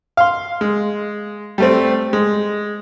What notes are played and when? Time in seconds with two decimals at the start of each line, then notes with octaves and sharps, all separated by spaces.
0.17 F5 C6
0.61 G#3
1.58 G3 A3 C4
2.13 G#3